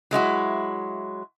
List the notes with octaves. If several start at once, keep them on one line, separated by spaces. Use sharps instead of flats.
F#3 G#3 E4 F#4